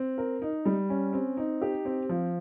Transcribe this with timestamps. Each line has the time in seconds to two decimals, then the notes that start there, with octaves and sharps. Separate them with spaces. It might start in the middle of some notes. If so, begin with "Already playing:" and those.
Already playing: C4
0.18 A#4
0.42 D#4
0.65 G3
0.89 C#4
1.13 C4
1.37 D#4
1.62 G4
1.85 C4
2.09 F3